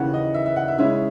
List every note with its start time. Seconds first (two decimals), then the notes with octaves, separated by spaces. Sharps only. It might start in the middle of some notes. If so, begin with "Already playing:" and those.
Already playing: D#2 C#3 E3 F#5
0.14 D#5
0.34 E5
0.46 E5
0.56 F#5
0.68 E5
0.78 C#3 G#3 C#4 E4 E5